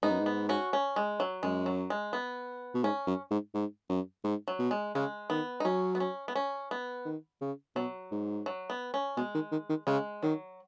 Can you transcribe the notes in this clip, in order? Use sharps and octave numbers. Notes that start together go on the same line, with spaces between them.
G#2 B3 D#4
F#2
G#2
B3
C#4 F#4
C#4
G#3
F#3
F#2 G#3
F#3
G#3
B3
B2
G#2 C#4
F#2
G#2
G#2
F#2
G#2
F#3
B2
G#3
C#3 G#3
D#3 B3
D#4
F#3 C#4
B3
C#4
B3
C#4
B3
D#3
C#3
B2 F#3
G#2
F#3
B3
C#4
B2 G#3
D#3
D#3
D#3
C#3 G#3
D#3 F#3